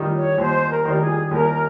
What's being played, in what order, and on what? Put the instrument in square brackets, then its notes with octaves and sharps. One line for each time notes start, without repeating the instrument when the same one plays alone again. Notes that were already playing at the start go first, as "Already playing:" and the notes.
Already playing: [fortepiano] D#3 G3
[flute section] C#5
[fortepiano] D#2 [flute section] C5
[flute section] A#4
C5
[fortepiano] D#3 G3 [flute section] A#4
[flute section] G#4
G#4
[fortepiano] D#2 [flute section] A#4